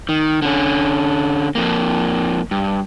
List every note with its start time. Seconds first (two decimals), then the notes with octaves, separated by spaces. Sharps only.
0.09 D#3
0.42 D3 C#4
1.55 F2 A#3
2.51 G2